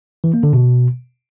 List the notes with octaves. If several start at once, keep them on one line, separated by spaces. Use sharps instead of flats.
E3
A#3
D3
B2